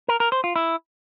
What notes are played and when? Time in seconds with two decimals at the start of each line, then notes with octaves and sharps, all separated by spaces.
0.08 A#4
0.20 A#4
0.32 C5
0.44 F4
0.56 E4